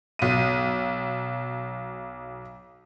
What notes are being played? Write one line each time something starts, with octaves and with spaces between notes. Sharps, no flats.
B1 D#7